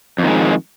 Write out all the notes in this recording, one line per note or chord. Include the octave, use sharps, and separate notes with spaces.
F2 D#3 G#3